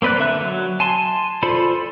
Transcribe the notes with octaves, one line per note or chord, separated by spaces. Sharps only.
A#3 C4 B4 D5 F#6
D3 E5 F#6
F#3
G#5 A5 C6
F4 A4 C5 D5 B5